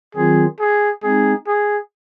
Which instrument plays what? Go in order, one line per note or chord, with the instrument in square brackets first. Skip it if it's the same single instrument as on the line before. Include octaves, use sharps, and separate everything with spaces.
[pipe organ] D#3 F#3 C4 F4 [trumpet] G#4
[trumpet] G#4
[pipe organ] G#3 C4 D#4 [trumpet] G#4
[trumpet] G#4